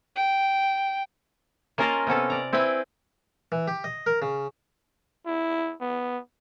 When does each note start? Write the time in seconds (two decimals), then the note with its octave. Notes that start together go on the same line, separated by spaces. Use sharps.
0.16 G5
1.78 A#3 C#4 F4 A#4 D#5 A5
2.07 C3 B3 C#4 A4
2.30 D5 A#5
2.53 C4 E4 B4 G5 G#5
3.52 E3
3.68 G4
3.84 D#5
4.06 A#4
4.22 C#3
5.26 E4
5.81 B3